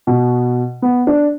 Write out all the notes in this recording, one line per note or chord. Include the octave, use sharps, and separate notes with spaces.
B2
B3
D4